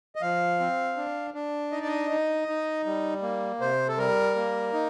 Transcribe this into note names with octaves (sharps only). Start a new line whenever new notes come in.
D#5
F3 F5
C4
D4
D4
D#4 D#5
D5
D#5
D#4
D#4
G3
A#3
C3 C5
A4
G3 A#4
A#3
D#4